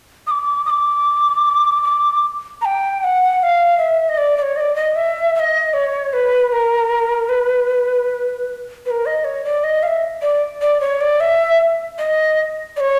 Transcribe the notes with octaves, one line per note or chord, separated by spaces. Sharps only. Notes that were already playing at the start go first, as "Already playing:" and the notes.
D#6
D6
D#6
D6
D6
A#5
G5
G5
F#5
F#5
F5
E5
D#5
D5
D5
C#5
D#5
D5
D#5
E5
E5
D#5
C#5
B4
A#4
B4
B4
A#4
D#5
C#5
D5
D#5
F5
E5
D5
D5
C#5
D5
E5
D#5
D5
C#5